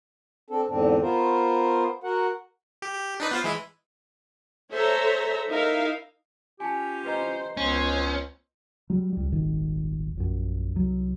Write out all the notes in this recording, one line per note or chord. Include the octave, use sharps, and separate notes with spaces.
C4 D4 A4
E2 G#2 D3 C4 D4
B3 F4 A#4 C5
F#4 A#4 F#5
G4
G4
D4 D#4 B4
B3 F4 C5
E3 G#3 E4
A4 C5 C#5 E5 A#5
D#4 E4 A#4 E5 F5
C#4 F4 G4 G#5 A5
B4 C5 D#5 A#5
C#2 B3 C#4 C5
F#3 G3
C#2 G3
D#1 G#1 D#3
A#1 F#2
C2 F#3